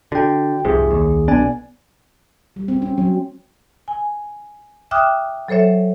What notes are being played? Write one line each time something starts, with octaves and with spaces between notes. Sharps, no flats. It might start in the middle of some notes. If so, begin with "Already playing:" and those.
D3 F#4 G5
C2 F2 G#2 C3 G#4
D#2
B1 B3 D4 G#5
G3
C4
C#4
F#3
G#5
E5 G5 D6 D#6 F6 F#6
F#3 A4 C5 C#5 E5